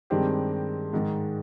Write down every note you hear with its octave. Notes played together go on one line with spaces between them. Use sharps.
G2 D#3 G#3 C4 G4
G#2 D#3 G#3